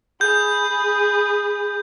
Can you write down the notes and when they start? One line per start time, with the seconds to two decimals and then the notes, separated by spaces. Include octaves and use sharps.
0.21 G#4 B5 G6